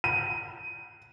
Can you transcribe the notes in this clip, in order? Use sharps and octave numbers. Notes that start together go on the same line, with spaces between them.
D#7